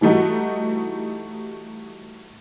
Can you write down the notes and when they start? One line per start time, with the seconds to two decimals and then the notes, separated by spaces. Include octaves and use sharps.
0.01 E3 G3 A3 D#4 F#4